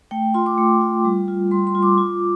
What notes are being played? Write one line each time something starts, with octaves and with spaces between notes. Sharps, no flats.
A3 G5
F4 C6
D6
A3
F4
G3
F4
G3 C6
C6
F4
D6
F4